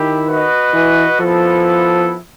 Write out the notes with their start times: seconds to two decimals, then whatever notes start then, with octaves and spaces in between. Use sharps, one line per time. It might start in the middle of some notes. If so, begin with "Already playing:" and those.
Already playing: D#3 E4 G4
0.27 F#4 B4 D#5
0.74 E3
1.20 F3 B3 E4 A4